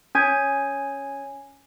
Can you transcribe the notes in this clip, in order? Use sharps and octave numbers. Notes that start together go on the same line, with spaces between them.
C#4 G#5 G#6